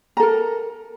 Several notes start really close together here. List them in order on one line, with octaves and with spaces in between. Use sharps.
A#5 A4 A#4